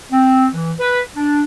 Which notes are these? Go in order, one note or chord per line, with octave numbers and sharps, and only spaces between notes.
C4
E3
B4
D4